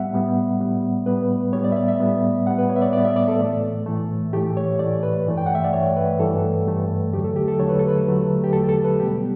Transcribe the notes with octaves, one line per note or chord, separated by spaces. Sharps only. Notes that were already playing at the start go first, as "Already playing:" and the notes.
Already playing: A2 G3 B3 E5 F#5
A2 G3 B3
A2 G3 B3
A2 G3 B3 B4
A2 G3 B3 C#5
D5
E5
D5
E5
A2 G3 B3
A2 G3 B3 F#5
B4
C#5
E5
D5
A2 G3 B3 D5
E5
D5
A4
A2 E3 A3
A2 E3 A3
A2 E3 A3 G4
C#5
A2 E3 A3 D5
B4
G2 E3 A3
G5
F#5
E5
D5
G2 E3 A3 C#5
B4
G2 E3 A3 A4
G2 E3 A3
E2 D3 F#3 A3 G4
A4
G4
A4
E2 D3 F#3 A3 C#5
B4
A4
B4
E2 D3 F#3 A3
G4
E2 D3 F#3 A3 A4
A4
B4
B2 G3 B3 G4